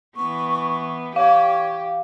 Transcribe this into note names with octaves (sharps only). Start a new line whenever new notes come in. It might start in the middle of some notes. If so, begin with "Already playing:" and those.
E3 B3 C#6
G4 C#5 F5